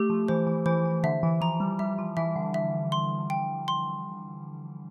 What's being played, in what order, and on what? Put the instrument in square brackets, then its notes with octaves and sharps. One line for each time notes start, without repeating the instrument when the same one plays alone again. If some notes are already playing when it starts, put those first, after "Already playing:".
Already playing: [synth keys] A3 [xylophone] G4
[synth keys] F3
[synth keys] E3 [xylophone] C5
[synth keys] E3
[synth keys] E3 [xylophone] C5
[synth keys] E3
[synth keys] D3 [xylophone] E5
[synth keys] E3
[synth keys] F3 [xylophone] A#5
[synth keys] G3
[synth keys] G3 [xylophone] E5
[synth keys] F3
[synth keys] E3 [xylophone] E5
[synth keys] D3
[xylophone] E5
C6
G5
C6